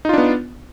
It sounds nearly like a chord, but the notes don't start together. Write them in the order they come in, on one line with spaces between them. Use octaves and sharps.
D#4 F4 D4 B3